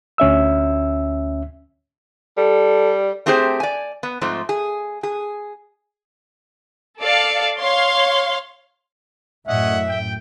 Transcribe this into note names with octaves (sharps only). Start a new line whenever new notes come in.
D2 C#4 E5 E6
G3 A4
A3 C4 G4 G#4 A#4 C5
D5 G#5
B3
G#2 F3 A3 C4
G#4
G#4
A4 D5 F5 C#7
C#5 F5 C6
F#2 A2 C#4 D#5 E5 F#5
G5